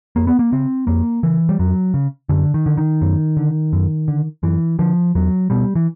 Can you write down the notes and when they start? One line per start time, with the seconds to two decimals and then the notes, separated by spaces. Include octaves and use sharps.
0.16 F2 A#3
0.27 B3
0.39 A#3
0.52 C#3 C4
0.87 F2 A#3
1.23 C#3 E3
1.49 G3
1.59 F2 F#3
1.94 C#3
2.29 F#2 D3
2.54 D#3
2.66 D3
2.77 D#3
3.01 F#2
3.37 D3
3.73 F#2
4.08 D3
4.43 F#2 E3
4.79 D3 F3
5.15 E2 F#3
5.50 B2 G3
5.75 E3